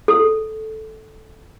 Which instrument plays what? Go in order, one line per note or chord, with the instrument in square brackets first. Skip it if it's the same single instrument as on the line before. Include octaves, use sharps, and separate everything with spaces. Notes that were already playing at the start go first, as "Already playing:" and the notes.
[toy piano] A4